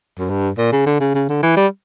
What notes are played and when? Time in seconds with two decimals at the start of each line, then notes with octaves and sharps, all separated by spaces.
0.19 F#2
0.30 G2
0.58 A#2
0.72 C#3
0.86 D3
1.00 C#3
1.15 C#3
1.29 D3
1.43 E3
1.57 G3